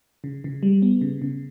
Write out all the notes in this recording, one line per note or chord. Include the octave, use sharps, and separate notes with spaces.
C#3
C#3
G3
B3
C#3
C#3